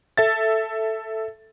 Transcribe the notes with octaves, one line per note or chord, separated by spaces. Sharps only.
A4 E5 A6